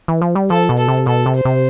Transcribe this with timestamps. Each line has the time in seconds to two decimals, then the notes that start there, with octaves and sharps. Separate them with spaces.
0.08 E3
0.22 F3
0.35 G3
0.50 F3 A4
0.69 B2
0.78 A4
0.88 C3
1.06 B2 A4
1.26 C3
1.35 C5
1.45 C3